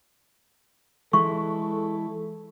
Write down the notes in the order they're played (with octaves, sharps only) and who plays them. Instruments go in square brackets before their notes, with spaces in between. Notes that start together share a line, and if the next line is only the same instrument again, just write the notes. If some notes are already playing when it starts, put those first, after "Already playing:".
[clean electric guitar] E3 G#3 E4 [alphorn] A4 [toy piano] C#6